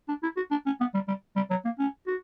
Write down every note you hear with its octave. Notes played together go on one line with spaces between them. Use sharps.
D4
E4
F#4
D4
C#4
B3
G3
G3
G3
F#3
A#3
C#4
F#4